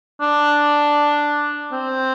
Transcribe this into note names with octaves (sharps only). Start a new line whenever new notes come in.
D4
C4